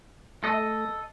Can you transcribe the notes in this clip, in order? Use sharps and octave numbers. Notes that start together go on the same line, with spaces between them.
A3 A4 D#5